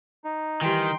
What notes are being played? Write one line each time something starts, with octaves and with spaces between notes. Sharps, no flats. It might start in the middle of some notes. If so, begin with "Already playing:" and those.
D#4
D#3 E3 G3 G5 C6